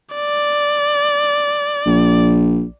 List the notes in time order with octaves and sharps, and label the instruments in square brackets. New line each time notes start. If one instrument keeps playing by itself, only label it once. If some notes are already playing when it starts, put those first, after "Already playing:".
[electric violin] D5
[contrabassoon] A#1